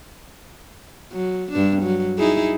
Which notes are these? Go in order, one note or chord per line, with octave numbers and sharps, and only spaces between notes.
F#3
G2 D4
F#3
D#4 E4 G#4